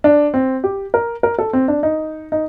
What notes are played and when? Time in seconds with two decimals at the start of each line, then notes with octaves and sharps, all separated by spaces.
0.04 D4
0.34 C4
0.64 G4
0.94 A#4
1.23 A#4
1.39 A4
1.53 C4
1.68 D4
1.83 D#4
2.32 D#4